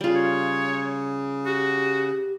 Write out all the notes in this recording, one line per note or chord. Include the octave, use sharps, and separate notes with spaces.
C#3 G3 F4
C#5
F#4 G4